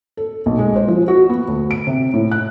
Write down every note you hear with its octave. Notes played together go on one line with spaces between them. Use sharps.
A4
B1
G#3
C5
F3
F#4
B3
D2
D7
C3
A2
F#6